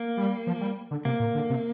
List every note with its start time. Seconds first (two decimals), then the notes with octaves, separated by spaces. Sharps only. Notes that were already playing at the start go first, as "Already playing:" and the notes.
Already playing: A#3
0.17 G3
0.47 F3
0.61 G3
0.91 D3
1.05 C3 A#3
1.20 A#2
1.35 D3
1.50 C3